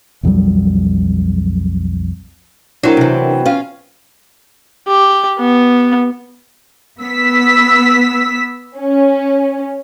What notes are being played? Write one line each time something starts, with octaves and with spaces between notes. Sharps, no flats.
B1 F2 F#3 G3
F#3 C4 D4 E4 A#4
C3 E3
C#4 F4 F5
G4
B3
B3 E6 B6
C#4